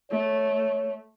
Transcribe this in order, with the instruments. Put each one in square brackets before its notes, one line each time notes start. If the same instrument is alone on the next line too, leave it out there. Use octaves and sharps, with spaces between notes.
[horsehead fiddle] A3 [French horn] C#5